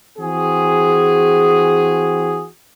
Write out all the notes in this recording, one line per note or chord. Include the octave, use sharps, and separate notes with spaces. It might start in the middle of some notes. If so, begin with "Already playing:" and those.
E3 C4 F#4 G#4